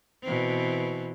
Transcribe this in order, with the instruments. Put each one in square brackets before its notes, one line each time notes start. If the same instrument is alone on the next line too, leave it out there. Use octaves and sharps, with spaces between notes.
[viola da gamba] B2 E3 C4